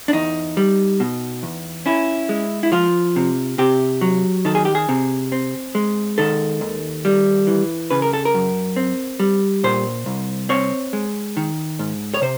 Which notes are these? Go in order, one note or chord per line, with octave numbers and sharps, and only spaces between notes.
D4
E2 D#4
G3
B2
E2
C#4 E4
G#3
E4
F3 F4
C3
C3 G4
F#3
D#3 A4
G#4
G4
G#4
C3
C4
G#3
D#3 A4
D#2
G3
E3
C#3 B4
A#4
A4
A#4
F#2
C4
G3
A#2 C5
C2
C4 C#5
G#3
D#3
G#2
C#5
C3 C5